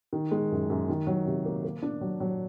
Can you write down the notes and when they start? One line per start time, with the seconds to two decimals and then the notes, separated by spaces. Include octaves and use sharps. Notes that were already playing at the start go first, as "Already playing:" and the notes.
0.13 D#3
0.31 G#3
0.52 F#2
0.70 F#2
0.89 D#3
1.07 F#3
1.27 C3
1.45 A#3
1.64 A#3
1.82 D4
2.01 F#3
2.20 F#3